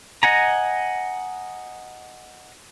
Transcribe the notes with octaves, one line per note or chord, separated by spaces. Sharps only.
D#5 F#5 G#5 A#5